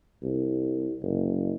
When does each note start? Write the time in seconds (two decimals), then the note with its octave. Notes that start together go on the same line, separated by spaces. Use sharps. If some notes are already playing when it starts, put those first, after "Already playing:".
0.23 C2
1.03 F#1